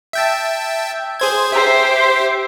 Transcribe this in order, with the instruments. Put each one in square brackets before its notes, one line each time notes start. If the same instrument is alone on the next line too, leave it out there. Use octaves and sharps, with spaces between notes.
[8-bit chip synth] E5 G5 A5
G#4 C5 G#6
[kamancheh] G4 C5 [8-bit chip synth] E5